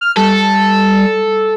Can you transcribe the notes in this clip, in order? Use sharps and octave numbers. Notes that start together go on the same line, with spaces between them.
F6
G3 A4